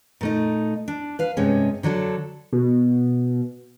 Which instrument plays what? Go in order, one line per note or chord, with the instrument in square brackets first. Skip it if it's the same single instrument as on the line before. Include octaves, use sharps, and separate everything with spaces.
[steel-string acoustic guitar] A#2 A3 D#4
D4
B4 F5
G2 C3 G#3 C#4
D3 F#3 D4 A4
[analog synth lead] B2